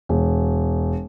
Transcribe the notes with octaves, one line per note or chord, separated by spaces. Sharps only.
E1